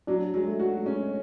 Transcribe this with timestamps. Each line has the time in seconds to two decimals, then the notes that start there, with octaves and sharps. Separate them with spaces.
0.07 F#3 D4
0.34 F#3 G#3
0.47 A3
0.59 F#4
0.85 G#3 C#4